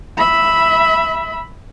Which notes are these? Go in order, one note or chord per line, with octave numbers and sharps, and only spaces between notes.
E5 B5